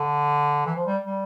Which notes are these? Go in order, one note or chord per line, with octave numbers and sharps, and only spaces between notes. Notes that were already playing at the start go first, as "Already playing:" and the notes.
Already playing: D3
E3
F3
G3
G3